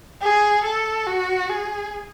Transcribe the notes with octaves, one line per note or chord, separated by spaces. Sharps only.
G#4
A4
F#4
G#4